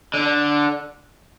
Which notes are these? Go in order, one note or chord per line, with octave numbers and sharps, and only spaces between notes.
D3